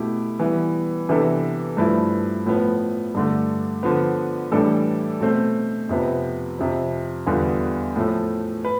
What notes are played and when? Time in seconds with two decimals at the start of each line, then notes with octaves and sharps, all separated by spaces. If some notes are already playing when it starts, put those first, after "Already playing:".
Already playing: B2 A3 E4 G4
0.39 E3 G3 B3 E4
1.09 C3 E3 B3 D4 A4
1.77 G2 F3 A3 E4 B4
2.46 A2 F3 B3
3.15 G2 D3 A3
3.83 D3 F3 B3
4.52 A2 E3 G3 D4 A4
5.21 B2 A3 C4
5.89 F2 C3 F3 B3
6.59 F2 C3 F3
7.27 E2 D3 G3 B3 F4
7.96 A2 F3 A3
8.65 B4